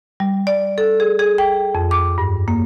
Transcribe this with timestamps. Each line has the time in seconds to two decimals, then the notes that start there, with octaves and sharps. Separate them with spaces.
0.20 G3
0.47 D5
0.78 A4
1.00 G#4
1.19 G#4
1.38 G5
1.75 F2
1.91 D6
2.18 G2
2.48 A#3